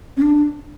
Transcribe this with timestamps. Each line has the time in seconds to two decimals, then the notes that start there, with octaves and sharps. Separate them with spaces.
0.17 C#4
0.21 D4